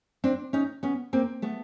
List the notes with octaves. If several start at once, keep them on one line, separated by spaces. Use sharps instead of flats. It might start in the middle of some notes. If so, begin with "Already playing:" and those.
C4 D4
C#4 D#4
B3 C#4
A#3 C4
A3 B3